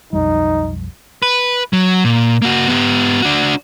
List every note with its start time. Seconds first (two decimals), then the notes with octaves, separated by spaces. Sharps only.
0.13 B1 F2 G3 D#4
1.22 B4
1.73 F#3
2.04 A#2
2.42 A#3 F#4
2.68 B3 G4
3.22 D4 F#4